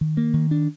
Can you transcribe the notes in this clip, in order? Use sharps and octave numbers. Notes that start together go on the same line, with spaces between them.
D#3
A#3
D#3
D4